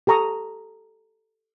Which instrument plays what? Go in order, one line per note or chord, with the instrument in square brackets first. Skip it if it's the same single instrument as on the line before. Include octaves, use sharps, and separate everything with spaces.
[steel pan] G4 A4 A#5 C#6 D#6